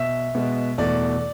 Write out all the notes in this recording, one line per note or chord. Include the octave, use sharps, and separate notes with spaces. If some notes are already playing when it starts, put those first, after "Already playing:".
Already playing: B2 E5
B2 G#3 B3
E2 B2 A3 D5